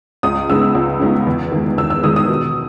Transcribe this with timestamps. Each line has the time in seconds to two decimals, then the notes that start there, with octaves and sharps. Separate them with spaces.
0.23 C#2 D#6
0.49 C#3 G#3 B3 D#4 E6
0.75 C#2
1.00 C#3 G#3 B3 D#4
1.27 E2
1.52 D#3 G#3
1.78 E2 E6
1.90 E6
2.03 D#3 G#3 D#6
2.16 D#6
2.29 B2